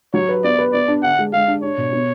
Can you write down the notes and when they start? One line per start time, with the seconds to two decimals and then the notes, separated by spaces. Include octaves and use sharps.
0.14 F#3 C#5
0.29 B4
0.44 B3 D5
0.59 B4
0.73 B3 D5
0.88 D4
1.03 D3 F#5
1.19 G#3
1.33 G#3 F5
1.47 D4
1.63 D4 C#5
1.77 B2
1.92 B3